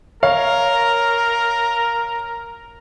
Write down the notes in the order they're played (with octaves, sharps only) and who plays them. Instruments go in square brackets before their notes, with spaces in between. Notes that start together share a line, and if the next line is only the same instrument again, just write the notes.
[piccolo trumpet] A#4 [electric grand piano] C#5 [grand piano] F5